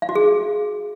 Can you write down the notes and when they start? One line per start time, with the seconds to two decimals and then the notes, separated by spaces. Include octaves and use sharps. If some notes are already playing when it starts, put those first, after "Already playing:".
0.02 F5
0.09 F#4
0.15 G#4